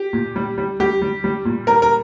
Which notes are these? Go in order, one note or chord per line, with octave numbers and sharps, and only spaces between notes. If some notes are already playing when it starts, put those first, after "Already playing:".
Already playing: G4
A#2
G3
G3
G3 G4
G3
G3
A#2
G3 A#4
A#4